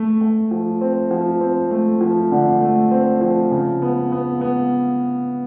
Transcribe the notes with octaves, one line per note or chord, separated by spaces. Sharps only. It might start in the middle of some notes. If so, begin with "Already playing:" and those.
Already playing: A3
A3
F3
C4
F3
C4
A3
F3
D3
A3
C4
F3
C#3
B3
B3
B3